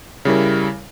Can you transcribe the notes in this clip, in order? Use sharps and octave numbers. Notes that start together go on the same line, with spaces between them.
C#3 G3 E4 A#4